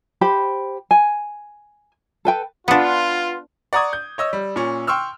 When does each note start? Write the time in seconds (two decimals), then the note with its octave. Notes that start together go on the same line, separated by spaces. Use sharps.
0.21 G4 C5 B5
0.91 G#5
2.25 A4 B4 G5
2.68 B3 D4 F4 B4 F#5
3.73 D5 F#5 A#5 C#6 D#6 G#6
3.93 G6
4.18 C#5 D#5 E6
4.33 G3
4.56 A#2 C#4
4.87 G5 C6 C#6 E6 F6